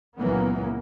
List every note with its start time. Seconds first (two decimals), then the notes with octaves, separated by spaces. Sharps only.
0.18 C#2 A#2 E3 F#3 A#3 B3